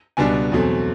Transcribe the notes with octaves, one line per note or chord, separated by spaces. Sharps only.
C#2 B2 G3 B3 D4 G#5
E2 B2 F#3 A3 C4